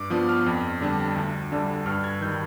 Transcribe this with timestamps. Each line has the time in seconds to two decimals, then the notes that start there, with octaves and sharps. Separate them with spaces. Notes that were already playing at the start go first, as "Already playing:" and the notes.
Already playing: G2 D6
0.10 F3 B3 D4 D#6
0.29 F6
0.46 F2
0.81 D3 G3 D4
1.16 D2
1.52 D3 G3 D4
1.86 G2 F6
2.04 G#6
2.21 D#3 G6
2.25 G3